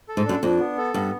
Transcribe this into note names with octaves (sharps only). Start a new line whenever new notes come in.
A4
G#2
F#2 D4
F2 D4
B3
A4
G2 B3